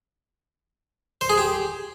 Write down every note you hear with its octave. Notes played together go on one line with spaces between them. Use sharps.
C5
G#4
G4